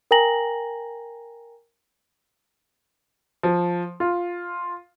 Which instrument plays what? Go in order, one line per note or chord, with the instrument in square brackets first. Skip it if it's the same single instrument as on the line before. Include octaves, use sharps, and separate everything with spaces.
[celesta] A#4 G5 G#5 A#5 A#6 F#7
[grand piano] F3
F4